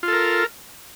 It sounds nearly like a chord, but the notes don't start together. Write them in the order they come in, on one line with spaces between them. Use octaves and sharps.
F4 A4 A#4